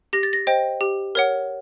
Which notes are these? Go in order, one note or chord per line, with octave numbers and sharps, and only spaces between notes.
G4 A#6
A6
A#6
C5 D#5 G5
G4
A#4 C#5 F#5